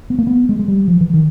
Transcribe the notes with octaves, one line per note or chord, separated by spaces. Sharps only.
B3
A#3
B3
G#3
G#3
G3
F3
E3
D#3